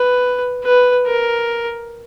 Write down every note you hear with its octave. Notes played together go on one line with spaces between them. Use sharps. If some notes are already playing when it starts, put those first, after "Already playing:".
Already playing: B4
B4
A#4